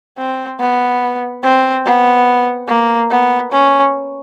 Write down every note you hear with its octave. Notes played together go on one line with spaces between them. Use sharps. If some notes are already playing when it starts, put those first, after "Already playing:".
C4
B3
C4
B3
A#3
B3
C#4